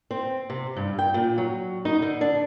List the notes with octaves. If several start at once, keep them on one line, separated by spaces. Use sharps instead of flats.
C4
C3
G2
G5
A#2
F#3
D#4
D3
D4